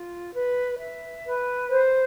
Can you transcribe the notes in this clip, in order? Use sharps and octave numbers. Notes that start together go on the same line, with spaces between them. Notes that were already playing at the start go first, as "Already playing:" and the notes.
Already playing: F4
B4
E5
B4
C5